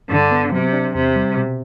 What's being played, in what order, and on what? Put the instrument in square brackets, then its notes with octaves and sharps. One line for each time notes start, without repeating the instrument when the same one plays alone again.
[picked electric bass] G2 [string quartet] D3
[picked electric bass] B3
[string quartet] C3 [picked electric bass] F#3
[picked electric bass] D4
[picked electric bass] E2 [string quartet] C3
[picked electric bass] G3
B2